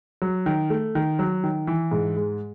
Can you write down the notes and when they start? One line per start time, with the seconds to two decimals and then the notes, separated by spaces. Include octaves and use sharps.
0.22 F#3
0.46 D#3
0.70 A3
0.95 D#3
1.19 F#3
1.44 D#3
1.67 E3
1.91 G#2
2.16 G#3